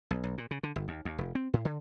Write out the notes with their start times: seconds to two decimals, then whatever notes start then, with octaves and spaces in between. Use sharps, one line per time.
0.11 B1
0.24 B1
0.38 A#2
0.51 C#3
0.63 D3
0.76 G1
0.88 D#2
1.05 D#2
1.18 F1
1.35 C4
1.53 A2
1.65 D3